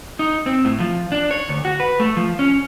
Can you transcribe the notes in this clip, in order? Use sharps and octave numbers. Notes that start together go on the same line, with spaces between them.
D#4
C4
A2
F3
D4
C#5
D2
F#4
B4
A3
F3
C#4